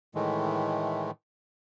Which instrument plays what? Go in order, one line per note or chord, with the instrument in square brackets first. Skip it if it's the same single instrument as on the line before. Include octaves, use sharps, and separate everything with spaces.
[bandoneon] A2 D#3 E3 G#3 A3